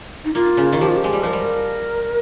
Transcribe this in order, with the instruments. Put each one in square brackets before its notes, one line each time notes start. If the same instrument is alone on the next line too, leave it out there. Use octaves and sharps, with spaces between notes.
[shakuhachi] D#4
[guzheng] A#3 [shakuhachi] F4
[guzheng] C#3
D#3
[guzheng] F3 [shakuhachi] G4
[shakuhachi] F4
G4
[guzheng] G#3
G3
[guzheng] F3 [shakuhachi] A#4 C5
[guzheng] G3